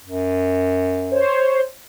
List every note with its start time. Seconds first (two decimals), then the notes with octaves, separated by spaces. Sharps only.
0.05 F#2
1.11 C5 C#5